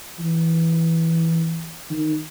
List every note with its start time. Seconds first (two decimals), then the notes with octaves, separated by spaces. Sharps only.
0.20 E3
1.90 D#3